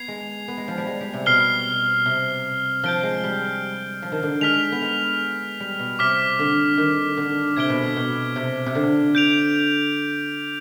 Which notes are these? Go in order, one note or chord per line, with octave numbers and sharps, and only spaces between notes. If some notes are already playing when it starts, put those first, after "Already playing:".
Already playing: B3 G#6 C7 F7
G#3
B3
G#3
F3
G3
G#3
G3
C3
B2 F6 C7 G7
C3
F3 G6 D7 G7
G#3
G3
F3
D#3
D3
G#3 F6 B6 F7
B3
G#3
G3
B2
C3 D6 F6 B6
D3
D#3
D3
C3 G#6 B6 D7 G7
B2
B2
B2
C3
C3
D3
G6 D7 F7